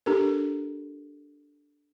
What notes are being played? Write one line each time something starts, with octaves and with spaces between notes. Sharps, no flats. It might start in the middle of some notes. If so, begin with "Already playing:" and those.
D4 G4 A4 A#4